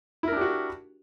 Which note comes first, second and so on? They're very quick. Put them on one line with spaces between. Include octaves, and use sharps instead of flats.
E4 A#4 D4 G4 F#4